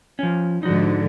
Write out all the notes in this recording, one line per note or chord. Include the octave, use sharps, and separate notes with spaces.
F3 C#4
G#2 D3 F3 D#4 F#4